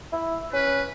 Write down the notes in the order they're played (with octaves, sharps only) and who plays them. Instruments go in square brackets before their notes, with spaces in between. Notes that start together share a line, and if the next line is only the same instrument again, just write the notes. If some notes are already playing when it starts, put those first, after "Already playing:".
[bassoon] E4
[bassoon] C#4 [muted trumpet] B4